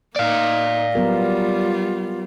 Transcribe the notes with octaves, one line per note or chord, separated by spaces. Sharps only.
A#3 D#4 D5 F5
F#3 G3 B3 F4 A#4